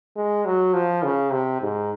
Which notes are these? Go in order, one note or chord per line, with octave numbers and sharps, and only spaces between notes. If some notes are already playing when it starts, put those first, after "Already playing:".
G#3
F#3
F3
C#3
C3
G#2